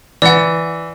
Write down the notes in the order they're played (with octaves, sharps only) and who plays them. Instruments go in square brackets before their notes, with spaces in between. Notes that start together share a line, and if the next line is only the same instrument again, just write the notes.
[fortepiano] E3 [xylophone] D5 F#5